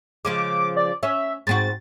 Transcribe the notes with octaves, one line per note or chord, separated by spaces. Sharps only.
C#3 F3 G#3 D6
D5
C#4 E5
G#2 C4 F#4 A6